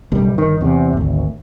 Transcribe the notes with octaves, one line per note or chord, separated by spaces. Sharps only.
F#1 B1 G3
G1 D#3
E2 C3
G#1 D2